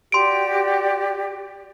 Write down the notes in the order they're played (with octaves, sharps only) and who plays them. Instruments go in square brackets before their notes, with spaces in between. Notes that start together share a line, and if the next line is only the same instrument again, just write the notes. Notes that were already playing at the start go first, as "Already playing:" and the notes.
[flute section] F#4 G4 D5 [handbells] C6 D7